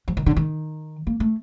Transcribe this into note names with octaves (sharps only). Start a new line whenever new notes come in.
F3
D#3
D3
D#3
A#3
A3